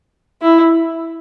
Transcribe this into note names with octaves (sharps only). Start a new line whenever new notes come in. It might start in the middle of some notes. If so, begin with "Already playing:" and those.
E4